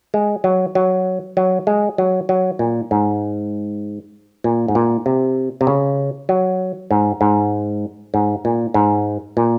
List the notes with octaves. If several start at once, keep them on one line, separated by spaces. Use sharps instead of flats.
G#3
F#3
F#3
F#3
G#3
F#3
F#3
A#2
G#2
A#2
G#2
A#2
C3
C3
C#3
F#3
G#2
G#2
G#2
A#2
G#2
A#2